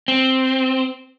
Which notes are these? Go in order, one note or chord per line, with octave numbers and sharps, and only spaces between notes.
C4